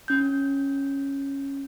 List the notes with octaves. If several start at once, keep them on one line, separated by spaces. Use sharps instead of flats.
C#4 G6